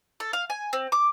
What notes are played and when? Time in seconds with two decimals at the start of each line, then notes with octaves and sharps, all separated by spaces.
0.20 A4
0.33 F5
0.50 G#5
0.73 C4
0.92 D6